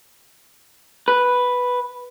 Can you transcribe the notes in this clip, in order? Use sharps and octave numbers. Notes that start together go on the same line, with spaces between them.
B4